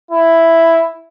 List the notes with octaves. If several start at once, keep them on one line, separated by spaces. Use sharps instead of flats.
E4